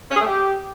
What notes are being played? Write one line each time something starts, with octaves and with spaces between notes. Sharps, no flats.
C#4
G#4
A3
G4